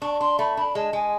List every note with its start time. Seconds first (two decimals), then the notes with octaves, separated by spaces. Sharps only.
0.01 D4 C#6
0.14 C#6
0.20 D4 C6
0.39 A3 B5
0.57 D4 B5
0.75 G#3 A5
0.93 G#3 G#5